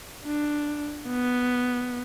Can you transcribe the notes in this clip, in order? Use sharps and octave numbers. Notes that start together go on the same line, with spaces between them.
D4
B3